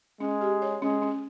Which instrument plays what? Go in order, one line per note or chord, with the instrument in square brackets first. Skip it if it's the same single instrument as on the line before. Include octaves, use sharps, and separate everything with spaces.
[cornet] G#3 [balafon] C#4
[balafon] G4
C#5
[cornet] G#3 [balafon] C#4
[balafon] C#4